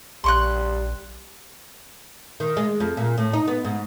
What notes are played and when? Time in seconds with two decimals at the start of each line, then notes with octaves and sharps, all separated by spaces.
0.24 A#1 G3 C6 C#6 F#6
2.40 D#3
2.57 G#3
2.80 F2
2.97 A#2
3.18 A2
3.33 D#4
3.48 B3
3.65 G#2